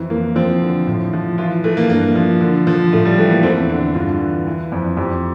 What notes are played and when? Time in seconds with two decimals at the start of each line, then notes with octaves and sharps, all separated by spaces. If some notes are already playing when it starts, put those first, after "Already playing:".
Already playing: F2 E3
0.10 E3 A#3
0.35 F3 C4
0.62 D3
0.87 A2
1.13 F3
1.38 E3 F4
1.64 E3 A3
1.77 A#3
1.90 G2 A#3
2.15 F3
2.40 D3
2.67 F3
2.93 A2 A3
3.05 G3
3.18 E3 A3
3.30 A#3
3.43 E2 C4
3.70 D3
3.94 G2 F4
4.20 E3
4.47 E3
4.72 F2
4.97 F2 G4